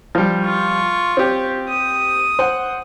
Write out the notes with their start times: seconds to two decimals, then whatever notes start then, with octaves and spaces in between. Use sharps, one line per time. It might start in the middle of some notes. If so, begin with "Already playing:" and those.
0.15 F3 G3
0.45 F4 C#6
1.17 C4 G4
1.69 D#6
2.39 C5 F#5